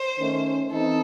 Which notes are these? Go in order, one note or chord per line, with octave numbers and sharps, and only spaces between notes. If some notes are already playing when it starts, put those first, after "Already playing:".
Already playing: C5
D#3 A3 C#4
E3 C4 D#4 A4